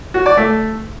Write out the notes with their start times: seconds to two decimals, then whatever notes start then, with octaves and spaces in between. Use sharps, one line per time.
0.14 F#4
0.26 D5
0.37 A3